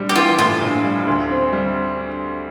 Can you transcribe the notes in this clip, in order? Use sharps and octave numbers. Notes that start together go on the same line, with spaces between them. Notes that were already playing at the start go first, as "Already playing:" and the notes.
Already playing: A#1 G3
G4
E3 F4
A2 F4
A#1
G3
D2
C4
G3